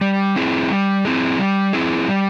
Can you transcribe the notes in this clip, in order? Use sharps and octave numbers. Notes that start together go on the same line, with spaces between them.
G3
C4 E4 G#4
G3
C4 E4 G#4
G3
C4 E4 G#4
G3